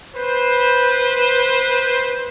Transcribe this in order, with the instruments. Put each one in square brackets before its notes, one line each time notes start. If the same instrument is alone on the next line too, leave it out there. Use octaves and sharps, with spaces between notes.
[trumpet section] B4 C5